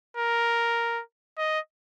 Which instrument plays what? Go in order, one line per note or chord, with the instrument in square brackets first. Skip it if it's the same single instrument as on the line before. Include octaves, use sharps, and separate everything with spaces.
[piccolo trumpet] A#4
D#5